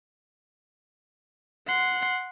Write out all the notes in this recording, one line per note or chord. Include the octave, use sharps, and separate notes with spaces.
F#5 C6